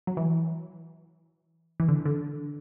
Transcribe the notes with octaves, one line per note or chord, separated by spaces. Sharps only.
F#3
E3
E3
D3
D3